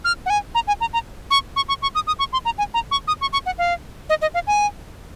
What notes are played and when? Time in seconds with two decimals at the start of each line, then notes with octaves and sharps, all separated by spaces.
0.04 F6
0.26 F#5
0.30 G#5
0.55 A#5
0.67 G#5
0.81 A#5
0.93 A#5
1.30 C#6
1.56 C#6
1.68 C#6
1.82 C#6
1.95 D#6
2.07 D#6
2.19 C#6
2.33 C6
2.45 A#5
2.58 G#5
2.74 A#5
2.91 C#6
3.07 D#6
3.21 C#6
3.33 C#6
3.46 F#5
3.58 F5
4.09 D#5
4.22 D#5
4.34 F5
4.47 G#5